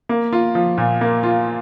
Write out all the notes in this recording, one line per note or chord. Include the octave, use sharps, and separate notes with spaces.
A#3
F4
F3
A#2
A#3
F4